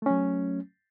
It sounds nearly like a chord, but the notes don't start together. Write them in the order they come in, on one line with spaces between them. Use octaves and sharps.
A3 C#4 F#3